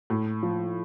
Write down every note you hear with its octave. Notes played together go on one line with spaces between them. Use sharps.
A2
F3